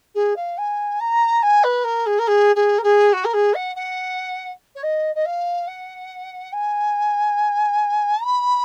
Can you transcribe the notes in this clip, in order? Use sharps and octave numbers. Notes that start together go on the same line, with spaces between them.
G#4
F5
G#5
A#5
G#5
B4
A#4
G#4
A#4
G#4
G#4
A#4
G#4
F#4
A#4
G#4
F#5
F#5
C#5
D#5
D#5
F5
F#5
G#5
B5